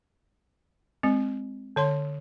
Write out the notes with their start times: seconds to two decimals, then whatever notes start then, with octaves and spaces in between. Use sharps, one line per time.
1.03 G#3 C4
1.76 D3 C#5 C6